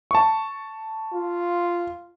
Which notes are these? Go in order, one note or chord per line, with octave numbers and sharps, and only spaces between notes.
A5 C#6
F4